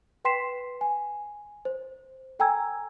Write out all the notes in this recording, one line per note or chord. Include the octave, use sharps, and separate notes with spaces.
B4 G5 C6 B6 C7 E7
G#5
C5
A4 G5 G#5 A#5 E6 G#6